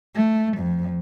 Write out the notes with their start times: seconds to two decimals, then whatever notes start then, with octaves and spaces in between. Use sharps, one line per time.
0.15 A3
0.57 F2